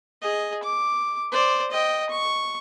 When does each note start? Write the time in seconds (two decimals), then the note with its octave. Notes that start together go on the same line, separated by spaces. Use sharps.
0.22 G#4 D#5
0.63 D6
1.32 C5 D5
1.71 D#5 G5
2.10 C#6